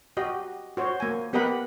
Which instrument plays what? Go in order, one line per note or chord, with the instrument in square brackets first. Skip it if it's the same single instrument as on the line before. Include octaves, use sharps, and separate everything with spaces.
[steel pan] F#4 G4 D#5
F#4 C5 C#5
A#3 G#5
B3 G4 A#4 D#5 F#5 B5